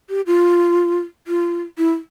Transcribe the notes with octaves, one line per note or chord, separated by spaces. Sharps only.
G4
F4
F4
E4